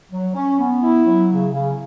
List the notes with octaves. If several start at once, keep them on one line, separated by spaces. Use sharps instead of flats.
F#3
C#4
B3
E4
F#3
C#3
C#3